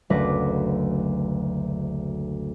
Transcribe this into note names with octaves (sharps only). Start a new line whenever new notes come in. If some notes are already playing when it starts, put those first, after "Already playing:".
F#1 D2 A3 B4 D6 A#6